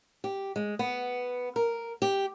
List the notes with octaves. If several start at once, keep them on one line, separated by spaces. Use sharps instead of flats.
G4
G#3
B3
A#4
G4